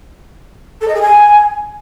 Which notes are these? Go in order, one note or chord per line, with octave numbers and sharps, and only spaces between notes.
A4
D#5
G#4
G#5